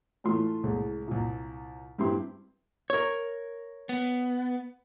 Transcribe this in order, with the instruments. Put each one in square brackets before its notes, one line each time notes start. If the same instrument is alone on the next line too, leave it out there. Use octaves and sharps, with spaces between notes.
[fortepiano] A2 E3 A3 F4 C6
C2 A2 G#3
C2 A#2
G2 C4 E4 G4 C6
[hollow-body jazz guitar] A#4 C#5
[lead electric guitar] B3